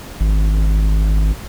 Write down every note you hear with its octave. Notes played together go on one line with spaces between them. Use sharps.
G#1